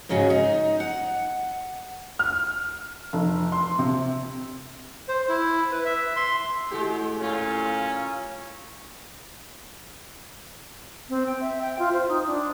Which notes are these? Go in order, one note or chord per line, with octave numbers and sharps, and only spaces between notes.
G#2 C#3 C#4 E4 F#4 G#4
D#4
F#5
F6
F1
C6
C3
C5
E4
B4
E5
C6
A2 G#3 F#4 G4
A#2 C#4 F4
C4
G5
E5
G5
F4
C5
D#4
D4